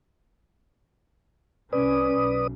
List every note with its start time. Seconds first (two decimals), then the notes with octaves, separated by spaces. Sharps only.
1.73 C2 C#4 B4 D5 D#6
2.15 B1